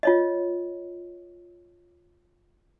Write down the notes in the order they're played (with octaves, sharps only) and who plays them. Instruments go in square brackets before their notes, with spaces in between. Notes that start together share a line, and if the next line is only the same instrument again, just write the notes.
[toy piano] F4 C#5 D#5